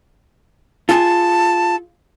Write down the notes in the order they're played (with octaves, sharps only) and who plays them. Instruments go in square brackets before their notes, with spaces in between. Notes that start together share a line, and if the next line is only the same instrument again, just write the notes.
[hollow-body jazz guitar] F4 G#4 [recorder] A5